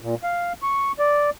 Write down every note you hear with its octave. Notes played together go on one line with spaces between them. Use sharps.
A#2
F5
C#6
D5